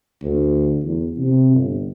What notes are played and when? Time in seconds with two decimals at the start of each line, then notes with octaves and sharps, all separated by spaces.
0.22 D2
0.83 E2
1.17 C3
1.54 G1